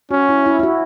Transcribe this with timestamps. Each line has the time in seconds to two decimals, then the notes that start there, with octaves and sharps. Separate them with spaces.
0.11 C#4 F#4
0.29 E4
0.46 E4
0.59 E4
0.63 F#4